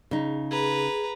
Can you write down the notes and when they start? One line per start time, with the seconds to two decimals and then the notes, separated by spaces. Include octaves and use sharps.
0.11 C#3 D#4
0.51 G#4 B4 A#5